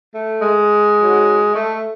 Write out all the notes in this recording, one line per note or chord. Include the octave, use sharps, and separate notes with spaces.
A3
G#3
G#2 F#3
A3